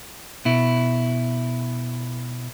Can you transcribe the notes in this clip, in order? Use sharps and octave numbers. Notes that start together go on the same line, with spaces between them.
B2 E4